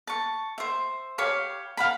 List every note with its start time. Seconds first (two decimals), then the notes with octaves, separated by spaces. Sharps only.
0.07 A5 C#6
0.58 C5 E5
1.18 G4 C#5 F5 B5
1.77 F5 F#5 B5